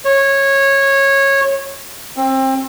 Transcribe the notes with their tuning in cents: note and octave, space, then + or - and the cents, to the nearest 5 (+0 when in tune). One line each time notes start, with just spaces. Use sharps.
C#5 -15
C4 +25